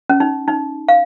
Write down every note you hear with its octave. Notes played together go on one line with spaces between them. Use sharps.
C#4
D#4
D#4
F5